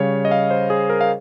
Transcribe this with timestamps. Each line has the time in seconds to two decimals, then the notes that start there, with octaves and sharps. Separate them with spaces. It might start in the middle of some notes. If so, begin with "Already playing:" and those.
Already playing: C#3 G3 C#5 F5
0.25 D#5
0.31 F5
0.50 C5
0.70 G#4
0.90 A#4
1.01 F5